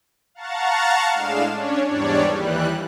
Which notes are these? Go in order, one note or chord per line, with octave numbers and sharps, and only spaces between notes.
F5 F#5 A5 A#5 C#6 A6
A2 G#3 D4 F5 E7
C#4 D4 C#5
E2 G#2 G3 D4 C#5 D5
D#2 E3 G3 F#6